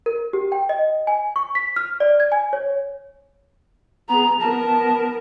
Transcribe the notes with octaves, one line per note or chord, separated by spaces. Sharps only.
A#4
G4
G5
D#5
G#5
C#6
B6
F6
D5
G#6
G#5
C#5
B3 G#4 A#5
B3 A#4 A5